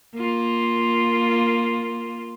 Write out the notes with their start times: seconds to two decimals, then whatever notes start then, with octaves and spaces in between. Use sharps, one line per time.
0.15 A#3 F4